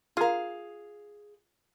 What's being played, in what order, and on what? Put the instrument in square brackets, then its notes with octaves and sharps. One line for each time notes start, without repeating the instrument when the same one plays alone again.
[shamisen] F4 A#4 [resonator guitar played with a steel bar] G#4 F5